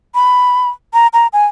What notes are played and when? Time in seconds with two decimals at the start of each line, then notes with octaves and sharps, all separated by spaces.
0.15 B5
0.94 A#5
1.13 A#5
1.33 G#5